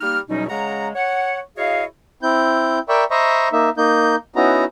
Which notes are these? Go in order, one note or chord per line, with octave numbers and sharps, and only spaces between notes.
G3 A#3 D#4 F6
E2 B2 F#3 G3 C#4 D#4
C#3 G#3 F#5 A#5
C#5 F#5
E4 F#4 G#4 C#5 D#5 F5
C4 E4 G6
A#4 D5 E5 G5 B5 C#6
C5 D#5 E5 A#5 B5 C#6
A#3 D#4 E5
A#3 D#4 G6
B3 C#4 D#4 E4 F#4 A#5